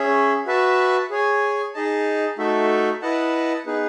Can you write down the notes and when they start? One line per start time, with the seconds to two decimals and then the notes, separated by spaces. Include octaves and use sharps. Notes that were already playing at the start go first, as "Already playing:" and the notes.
Already playing: C#4 G#4 C#5 E5
0.46 F#4 B4 E5 A5
1.10 G#4 C#5 G#5
1.74 D#4 G#4 D#5 A5
2.38 A3 D#4 F#4 A4 E5
3.01 E4 B4 D#5 F#5 A5
3.66 B3 D#4 G#4 B4